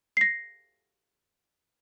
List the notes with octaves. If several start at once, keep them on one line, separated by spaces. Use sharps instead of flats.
A#6 C7